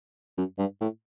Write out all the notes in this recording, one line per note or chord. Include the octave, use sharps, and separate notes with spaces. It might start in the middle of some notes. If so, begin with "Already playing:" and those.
F#2
G2
A2